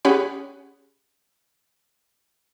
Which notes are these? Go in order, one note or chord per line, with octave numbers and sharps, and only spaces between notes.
C#4 G4 G#4 C#5 F#5 B5